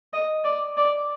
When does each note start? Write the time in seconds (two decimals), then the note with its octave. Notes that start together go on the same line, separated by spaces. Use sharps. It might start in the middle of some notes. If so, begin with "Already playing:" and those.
0.13 D#5
0.44 D5
0.77 D5